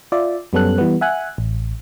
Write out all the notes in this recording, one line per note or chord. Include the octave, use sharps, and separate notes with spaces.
F4 D5 E5
F#2 G3 B3 C#4 A4 F#6
E3 G3 B3
E5 F#5 G#5 F#6
A1